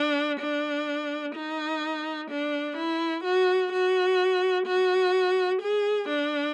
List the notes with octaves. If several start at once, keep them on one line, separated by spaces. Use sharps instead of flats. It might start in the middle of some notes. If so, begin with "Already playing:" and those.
Already playing: D4
D4
D#4
D4
E4
F#4
F#4
F#4
G#4
D4